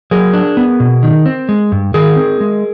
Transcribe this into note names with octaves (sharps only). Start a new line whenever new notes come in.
F#3 G#4 A#4
D4
B3
B2
D#3
C4
G#3
G2
D#3 G#4 A#4
C4
G#3